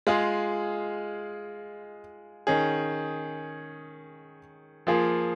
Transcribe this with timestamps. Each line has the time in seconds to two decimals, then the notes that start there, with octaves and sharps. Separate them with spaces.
0.07 G#3 F4 G#4
2.47 D#3 C#4 G#4
4.87 F3 A#3 F4 G#4